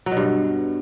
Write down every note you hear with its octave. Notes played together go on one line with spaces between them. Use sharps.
F#3
B2
G2